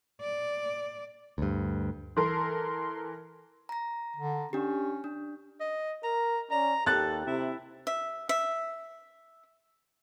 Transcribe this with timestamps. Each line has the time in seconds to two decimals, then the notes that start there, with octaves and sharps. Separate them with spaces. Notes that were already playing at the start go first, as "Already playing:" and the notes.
0.22 D5
1.38 D2 G2
2.17 E3 A4 A#4 C6
3.69 A#5 A#6
4.17 D3
4.53 C#4 D4 G4
5.04 D4
5.60 D#5
6.03 A#4 A#5
6.51 C#4 D5 A#5
6.86 D#2 G4 A4 F#6 A6
7.26 C3 E4
7.87 E5
8.29 E5